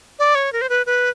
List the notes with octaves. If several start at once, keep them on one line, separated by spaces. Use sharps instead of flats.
D5
C#5
A#4
C5
B4
B4